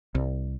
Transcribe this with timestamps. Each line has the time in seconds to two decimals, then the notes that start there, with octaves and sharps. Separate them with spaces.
0.15 C2